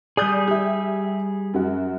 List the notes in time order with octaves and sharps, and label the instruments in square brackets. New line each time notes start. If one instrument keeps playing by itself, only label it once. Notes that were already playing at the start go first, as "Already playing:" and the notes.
[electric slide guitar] G3 G#4 [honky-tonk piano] D5 D#6 G6
[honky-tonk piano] G4 E5
F#2 F#4